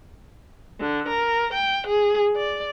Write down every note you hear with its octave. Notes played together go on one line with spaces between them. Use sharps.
D3
A#4
G5
G#4
D5